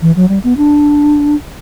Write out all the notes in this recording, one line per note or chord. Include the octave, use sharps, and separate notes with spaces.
E3
F#3
G3
B3
D4